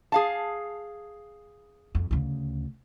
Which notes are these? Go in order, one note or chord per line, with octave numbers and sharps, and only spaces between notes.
G#4 F5 A5
F2
D2 C#3